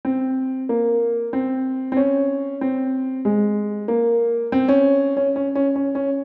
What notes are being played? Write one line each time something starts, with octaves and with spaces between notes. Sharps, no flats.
C4
A#3
C4
C4
C#4
C4
G#3
A#3
C4
C#4
C#4
C#4
C#4
C#4
C#4